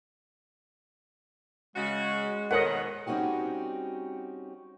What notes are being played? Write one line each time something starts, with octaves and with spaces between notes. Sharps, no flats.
C#3 G#3 F#4
B2 D#3 A4 A#4 C#5 D#5 F#5
G3 C4 C#4 D#4 F#4 G4